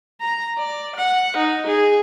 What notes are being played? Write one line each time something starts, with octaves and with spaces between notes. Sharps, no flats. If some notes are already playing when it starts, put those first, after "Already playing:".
A#5
D5
F#5
D#4
G#4